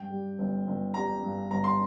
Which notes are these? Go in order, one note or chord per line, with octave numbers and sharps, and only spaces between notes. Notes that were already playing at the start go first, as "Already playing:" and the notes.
Already playing: G2 G5
G3
G1
G1
G3 A#5
G2
G1 A#5
C6